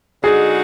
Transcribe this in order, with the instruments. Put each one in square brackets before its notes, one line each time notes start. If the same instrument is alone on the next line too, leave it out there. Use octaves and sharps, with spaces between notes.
[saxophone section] D3 G#3 D#4 F#4 [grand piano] G#4